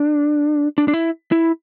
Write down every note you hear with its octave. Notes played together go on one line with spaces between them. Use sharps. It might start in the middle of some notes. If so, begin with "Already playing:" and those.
Already playing: D4
D4
D4
E4
E4